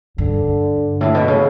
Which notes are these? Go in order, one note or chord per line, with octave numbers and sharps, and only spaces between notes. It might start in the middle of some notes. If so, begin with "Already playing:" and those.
G2 D3
A2 D3
B2
C#3